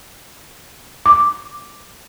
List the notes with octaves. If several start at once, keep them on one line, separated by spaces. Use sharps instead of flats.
D6